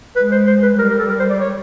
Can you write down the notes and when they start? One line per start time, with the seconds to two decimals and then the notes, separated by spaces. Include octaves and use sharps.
0.16 G#3 B4
0.32 C5
0.47 C5
0.63 B4
0.79 G3 A#4
0.89 A#4
0.99 A4
1.09 A#4
1.20 C5
1.30 D5
1.40 C#5